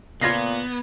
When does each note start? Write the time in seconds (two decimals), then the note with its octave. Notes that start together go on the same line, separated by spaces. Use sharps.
0.21 A#2 C#3 B3 F4 G#6 A#6 C7